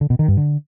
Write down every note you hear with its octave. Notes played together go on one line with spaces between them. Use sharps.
D3
B2
D#3
G2
D3